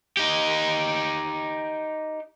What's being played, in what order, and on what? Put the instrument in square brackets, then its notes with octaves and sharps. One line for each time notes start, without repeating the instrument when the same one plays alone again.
[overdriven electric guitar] D#4 G4